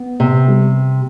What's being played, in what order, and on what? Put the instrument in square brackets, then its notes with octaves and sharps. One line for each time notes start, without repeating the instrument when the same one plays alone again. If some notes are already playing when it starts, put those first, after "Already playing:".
Already playing: [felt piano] B3
[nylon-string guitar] C3
[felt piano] G3